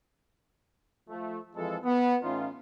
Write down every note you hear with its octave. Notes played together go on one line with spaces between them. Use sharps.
F3 A3
F2 E3 F3 G#3 A4
B3
A2 E3 C#4 D#4 F4